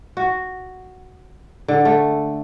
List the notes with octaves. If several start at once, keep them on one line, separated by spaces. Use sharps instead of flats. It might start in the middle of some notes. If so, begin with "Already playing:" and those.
F#4
D3
A3